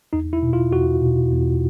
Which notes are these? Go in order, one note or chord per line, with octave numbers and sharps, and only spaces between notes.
E2 D#4
E4
B2
F4
E2 F#4
B2
E2